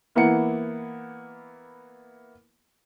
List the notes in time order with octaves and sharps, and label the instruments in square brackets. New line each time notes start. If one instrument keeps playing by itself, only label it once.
[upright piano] E3 A#3 B3 E4 F#5 C#7